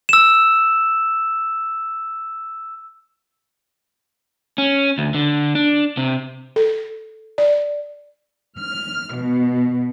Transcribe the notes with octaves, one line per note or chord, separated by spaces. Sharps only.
E6 E7
C#4
D2
D3
D4
C3
A4
D5
F6
B2